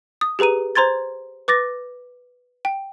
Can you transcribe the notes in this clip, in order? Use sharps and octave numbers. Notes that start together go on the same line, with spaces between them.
D#6
G4 G#4 B4 A#5 D#7
C5 A#5 C6 G#6 A6
B4 D6 A6 A#6
G5